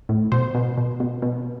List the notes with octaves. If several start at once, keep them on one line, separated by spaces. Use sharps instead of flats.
A2
B2 C5
B2
B2
B2
B2